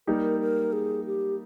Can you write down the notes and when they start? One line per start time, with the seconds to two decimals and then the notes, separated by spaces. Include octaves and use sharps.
0.07 G3 A#3 D#4 G4 A#4
0.40 A#4
0.72 G#4
1.06 G4